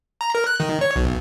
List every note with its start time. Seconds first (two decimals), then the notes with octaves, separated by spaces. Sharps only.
0.21 A#5
0.35 A#4
0.47 F#6
0.60 D#3
0.81 C#5
0.96 B1